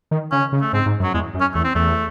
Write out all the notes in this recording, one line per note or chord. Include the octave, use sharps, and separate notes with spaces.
D#3
C#3 C#4
C#3
A3
G#2 C4
G#2
F#2
F#3
E2 G#3
F#2
C#4
E2 A3
C4
E2 A3